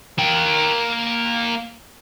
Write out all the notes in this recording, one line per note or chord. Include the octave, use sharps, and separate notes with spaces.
A#3 G5